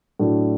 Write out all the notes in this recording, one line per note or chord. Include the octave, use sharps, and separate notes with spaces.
A2 F#3 A3 D4